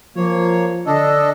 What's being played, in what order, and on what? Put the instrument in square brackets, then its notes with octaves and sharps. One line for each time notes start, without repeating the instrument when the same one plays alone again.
[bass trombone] F3 [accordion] A#3 C#5
[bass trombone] D3 [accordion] D4 A4 D#5